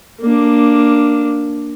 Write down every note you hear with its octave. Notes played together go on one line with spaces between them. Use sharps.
A#3 D4